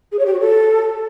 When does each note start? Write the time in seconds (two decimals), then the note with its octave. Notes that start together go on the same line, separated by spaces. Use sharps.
0.12 G#4
0.19 C#5
0.26 G4
0.33 F#4
0.40 A4